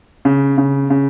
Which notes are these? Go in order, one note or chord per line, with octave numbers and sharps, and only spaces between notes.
C#3
C#3
C#3